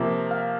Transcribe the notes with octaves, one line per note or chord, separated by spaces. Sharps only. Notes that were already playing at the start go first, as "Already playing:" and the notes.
Already playing: C3 F3 A#3 E5
F5